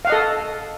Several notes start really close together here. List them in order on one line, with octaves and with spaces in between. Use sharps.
F5 F#5 D#5 A4